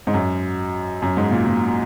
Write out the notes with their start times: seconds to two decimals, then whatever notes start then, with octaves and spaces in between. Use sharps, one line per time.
0.07 G#2
0.14 F#2
1.02 F#2
1.17 G#2
1.31 A#2
1.46 A#2